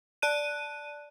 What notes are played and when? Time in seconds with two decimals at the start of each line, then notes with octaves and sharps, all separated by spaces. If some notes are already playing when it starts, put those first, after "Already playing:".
0.22 D5 A5 F#6 D#7